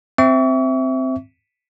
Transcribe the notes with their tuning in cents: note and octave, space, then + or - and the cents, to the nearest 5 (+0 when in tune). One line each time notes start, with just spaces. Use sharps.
C4 -5 E5 +0 C#6 +40